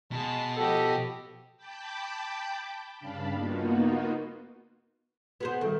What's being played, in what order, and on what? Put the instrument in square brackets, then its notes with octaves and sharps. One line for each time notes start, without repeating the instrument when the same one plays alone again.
[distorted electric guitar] B2 [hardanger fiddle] G#3 A5
[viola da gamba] F3 G4 [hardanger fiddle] F#4 D#5 [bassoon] A4
[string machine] G5 A5 B5 D6 G6
G2 C#3 D4 F5 A5 B5
A#3 B3 D#4 F4 F#4
[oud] B3 G#4 C5 [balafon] F#4
[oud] D#3 [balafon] G3 A4